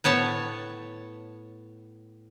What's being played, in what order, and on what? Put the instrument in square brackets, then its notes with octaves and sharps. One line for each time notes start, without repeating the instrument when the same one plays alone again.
[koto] A2 B3 C#5 A5